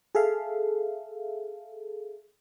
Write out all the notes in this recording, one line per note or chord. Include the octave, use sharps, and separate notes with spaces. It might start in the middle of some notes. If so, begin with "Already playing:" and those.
G#4 A4 E5 F5